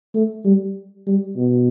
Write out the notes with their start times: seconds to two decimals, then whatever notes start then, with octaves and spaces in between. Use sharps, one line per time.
0.14 A3
0.45 G3
1.07 G3
1.37 B2